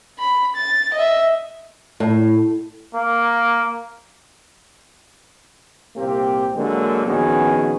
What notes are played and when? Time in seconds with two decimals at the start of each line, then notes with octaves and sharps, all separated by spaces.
0.19 B5
0.57 A6
0.94 D#5 E5
2.00 A2
2.94 A#3
5.96 C2 A#2 A#3 C4 G4
6.55 D3 F#3 G#3 A#3
7.05 A#1 D#3 B3 C#4 F#4 G#4